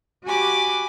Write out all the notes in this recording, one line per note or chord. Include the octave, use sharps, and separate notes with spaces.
F#4 G4 G#5 B5 D6